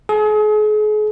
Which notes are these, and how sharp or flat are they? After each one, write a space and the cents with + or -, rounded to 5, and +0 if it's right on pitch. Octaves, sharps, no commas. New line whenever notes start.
G#4 +40